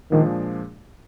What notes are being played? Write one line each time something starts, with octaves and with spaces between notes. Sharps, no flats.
A#2 D#3 F3 G#3 D4 G#4